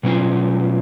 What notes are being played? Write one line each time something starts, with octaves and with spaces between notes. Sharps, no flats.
B2 F#3 C#4 F4